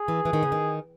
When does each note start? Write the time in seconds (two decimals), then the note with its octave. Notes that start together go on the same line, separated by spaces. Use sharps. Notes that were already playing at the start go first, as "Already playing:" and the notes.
Already playing: G#4
0.08 E3
0.25 E3
0.33 D#3
0.43 C#3
0.52 D#3